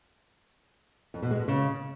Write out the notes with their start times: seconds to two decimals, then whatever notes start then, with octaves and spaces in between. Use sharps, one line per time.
1.14 F2
1.22 B2
1.31 G#3
1.39 B2
1.48 C#3